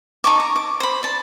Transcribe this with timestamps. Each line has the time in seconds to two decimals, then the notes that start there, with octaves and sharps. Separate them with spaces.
0.24 D#4 A5 C#6 D6
0.40 A#5
0.56 D6
0.80 C5 B5
1.03 D5 A5